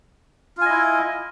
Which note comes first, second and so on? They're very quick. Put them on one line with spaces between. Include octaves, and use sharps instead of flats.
F4 G#5 D#5 E4